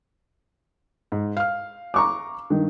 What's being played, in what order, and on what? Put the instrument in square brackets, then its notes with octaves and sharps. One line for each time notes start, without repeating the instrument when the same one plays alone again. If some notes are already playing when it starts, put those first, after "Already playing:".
[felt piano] G#2
F5 F6
[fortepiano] A#5 C#6 D6
G2 D#3